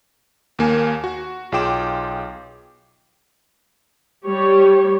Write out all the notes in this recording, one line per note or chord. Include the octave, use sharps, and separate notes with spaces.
D#2 A#3 G#5
F#4
B1 F4 G#4 G5 D6 E7
G3 G4 C#5